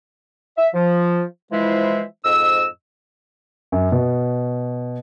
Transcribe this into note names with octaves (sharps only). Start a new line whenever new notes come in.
E5
F3
E3 F3 G#3 E4 C5 E5
F2 G#2 D#5 E6
F#2
B2